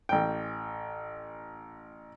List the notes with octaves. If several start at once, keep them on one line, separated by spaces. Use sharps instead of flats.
A1 G5